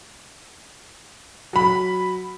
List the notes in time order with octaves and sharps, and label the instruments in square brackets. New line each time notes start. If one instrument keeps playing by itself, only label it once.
[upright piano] F#3 B5